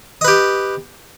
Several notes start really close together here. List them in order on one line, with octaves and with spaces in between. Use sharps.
D#5 B4 G4